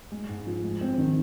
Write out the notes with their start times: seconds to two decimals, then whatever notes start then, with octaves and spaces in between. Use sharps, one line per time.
0.12 G#3
0.29 G#2
0.47 F3
0.63 G#3
0.81 C4
0.98 D#3